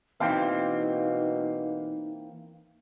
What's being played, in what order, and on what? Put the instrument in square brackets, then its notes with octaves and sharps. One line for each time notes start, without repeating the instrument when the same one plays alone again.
[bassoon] B2 [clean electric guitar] E3 A#3 C4 [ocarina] D#4 [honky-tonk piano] F5 G5 C6